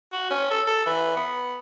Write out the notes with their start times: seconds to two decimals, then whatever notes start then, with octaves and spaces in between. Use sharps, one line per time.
0.12 F#4
0.30 C#4
0.50 A4
0.67 A4
0.86 E3
1.16 B3